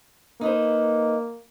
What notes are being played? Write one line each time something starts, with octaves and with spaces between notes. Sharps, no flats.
A#3 D#4 B4 C5